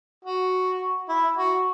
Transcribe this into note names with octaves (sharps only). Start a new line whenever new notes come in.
F#4
E4
F#4